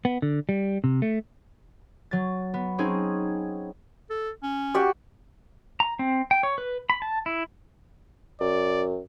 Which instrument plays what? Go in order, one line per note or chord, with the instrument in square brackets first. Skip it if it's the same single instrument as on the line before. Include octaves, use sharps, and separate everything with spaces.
[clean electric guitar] B3
D3
G3
C3
A3
[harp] F#3 A6
B3
C4 C#4 D#4 G#4
[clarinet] A4
C#4
[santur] F#4 G4 D5
[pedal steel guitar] A#5
C4
G5
C#5
B4
B5
A5
E4
[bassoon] F#2 [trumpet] D5